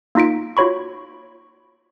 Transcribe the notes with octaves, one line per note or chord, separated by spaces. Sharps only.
A#3 D#4 F4 B6 D7
F4 F#4 C#5 B5 C#6